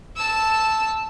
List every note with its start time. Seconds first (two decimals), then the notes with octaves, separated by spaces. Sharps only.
0.16 A5 E6